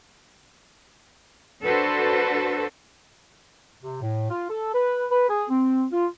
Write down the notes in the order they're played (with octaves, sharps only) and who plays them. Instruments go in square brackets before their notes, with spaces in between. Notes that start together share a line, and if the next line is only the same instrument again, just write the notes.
[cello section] D4 F#4 A4 B4 C5
[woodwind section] C3
A2
F4
A4
B4
B4
G#4
C4
F4